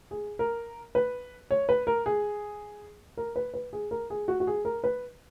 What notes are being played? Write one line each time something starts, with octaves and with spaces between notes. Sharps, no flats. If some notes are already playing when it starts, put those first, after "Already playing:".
G#4
A#4
B4
C#5
B4
A#4
G#4
A#4
B4
B4
G#4
A#4
G#4
F#4
F#4
G#4
A#4
B4